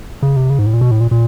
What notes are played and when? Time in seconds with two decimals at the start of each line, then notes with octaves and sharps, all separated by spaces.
0.22 C#3
0.36 C3
0.50 C#3
0.59 G#2
0.66 A2
0.74 A#2
0.81 B2
0.91 A2
1.01 A#2
1.11 A#2